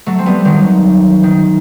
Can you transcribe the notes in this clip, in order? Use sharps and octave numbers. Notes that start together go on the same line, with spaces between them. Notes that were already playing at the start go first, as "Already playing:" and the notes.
F#3 A3
C4
G3 B3
D#3 F#3
D#3